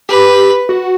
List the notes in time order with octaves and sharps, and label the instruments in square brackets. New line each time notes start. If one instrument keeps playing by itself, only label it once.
[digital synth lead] G4 [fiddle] B4
[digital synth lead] F#4